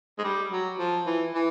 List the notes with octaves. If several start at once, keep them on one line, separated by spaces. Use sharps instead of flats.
G#3
G3
F#3
F3
E3
E3